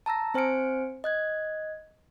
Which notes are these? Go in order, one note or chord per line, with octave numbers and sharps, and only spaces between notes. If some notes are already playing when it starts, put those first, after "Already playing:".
A5 A#5 E6 A#6
C4 C5 G#5 F6 C#7 D7
D#5 F#6 G#6